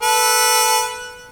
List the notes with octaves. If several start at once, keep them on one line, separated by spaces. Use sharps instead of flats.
A4 B4